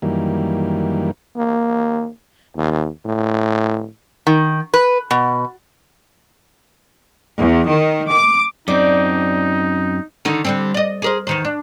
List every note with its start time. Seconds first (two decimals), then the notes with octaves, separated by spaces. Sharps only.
0.02 F#2 D#3 E3 G3 A#3
1.37 A#3
2.56 D#2
3.06 A2
4.27 D#3
4.74 B4
5.11 B2
7.38 E2
7.67 D#3
8.11 D6
8.68 F#2 C4 D#4 D5
10.25 D3 D#3 D#4
10.45 D3 G3 C4
10.74 D5 D#5
11.02 G#4 A#4 C5
11.27 E2 D#3 C5
11.45 D4